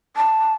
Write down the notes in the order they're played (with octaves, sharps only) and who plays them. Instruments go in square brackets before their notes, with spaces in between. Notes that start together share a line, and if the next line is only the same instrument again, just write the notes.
[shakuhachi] A5